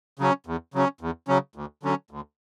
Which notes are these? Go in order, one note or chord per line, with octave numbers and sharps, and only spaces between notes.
C#3 F#3 C#4
E2
C#3 F#3 C#4
E2
C#3 F#3 C#4
D2
D3 F#3 C#4
D2